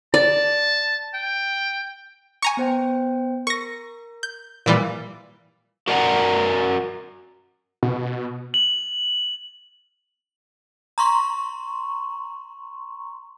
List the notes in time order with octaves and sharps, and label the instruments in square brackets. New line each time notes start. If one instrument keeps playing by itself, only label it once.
[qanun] D5 [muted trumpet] A5
[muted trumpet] G5
[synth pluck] G#5 A#5 C#6
[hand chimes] B3 C5 G5
[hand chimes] A#4 [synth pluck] C#6 A#6
[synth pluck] G6
[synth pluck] A#2 E3 G3 [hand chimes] F5 D6 E6
[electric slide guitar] F#4 A#4 D5 F5 F#5 A#5
[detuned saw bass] B2
[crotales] F#7
[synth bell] A#5 C6 C#6